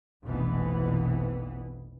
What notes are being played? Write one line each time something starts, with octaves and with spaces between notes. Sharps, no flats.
F1 A#1 F2 B2 E3 B3